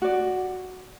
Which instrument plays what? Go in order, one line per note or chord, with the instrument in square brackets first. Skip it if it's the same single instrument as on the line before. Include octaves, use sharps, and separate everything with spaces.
[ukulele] F#4 D5